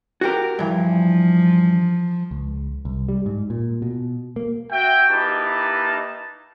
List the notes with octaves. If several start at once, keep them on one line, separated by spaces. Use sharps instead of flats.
F#4 G4 A#4
G2 E3 F3
C#2
C2
G3
G#2
A#2
B2
A#3
F#4 E5 G5
A#3 D#4 E4 G4 B4 A5